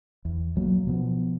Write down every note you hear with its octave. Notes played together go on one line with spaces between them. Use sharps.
E2
B1 F#3 A#3
B2 F3 B3